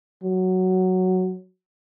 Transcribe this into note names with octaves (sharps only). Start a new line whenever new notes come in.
F#3